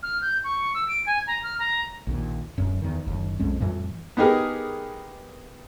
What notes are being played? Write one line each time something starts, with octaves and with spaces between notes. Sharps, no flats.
F6
G6
C#6
E6
D7
G#5
A#5
F6
A#5
A#1 D#2 A#2
D1 F#2
E2 D#3
F#1 D#2
B1 F2 G#3 C#4
F2 A2 E3 G3
B3 D#4 G4 G#4 A#4